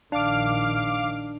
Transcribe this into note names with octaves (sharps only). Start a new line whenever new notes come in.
A#1 D#3 D4 F5 D6 F6